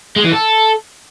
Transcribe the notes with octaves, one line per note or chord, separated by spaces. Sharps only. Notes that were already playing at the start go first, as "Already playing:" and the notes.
G#3
E3
A4